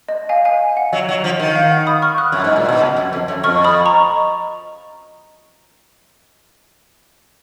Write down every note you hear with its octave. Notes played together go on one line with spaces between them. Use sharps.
D#5
F5 G#5
F5 G#5
F#5
F#3 D#5
F#3
F3
D#3
F5
F#5
B5 D#6
C#6 F6
D#6 F#6
F#2
G#2
A#2
B2
C#3
F#2
F2
F#2
F2 C#6 F6
B5 D#6
A#5 C#6